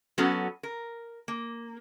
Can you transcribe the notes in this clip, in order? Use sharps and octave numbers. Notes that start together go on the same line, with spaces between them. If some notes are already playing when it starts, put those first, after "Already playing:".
F#3 B3 C#4 F#4 A4
A#4
A#3